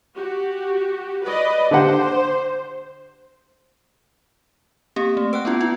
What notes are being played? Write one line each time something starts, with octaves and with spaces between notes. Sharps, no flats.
F#4 G4
B4 D5 D#5
D3 G4 C5 F#5
A#3 C4 G4
A3
B4 F#5 G5 F#6
B3 C#4 E4 F4
E4 F4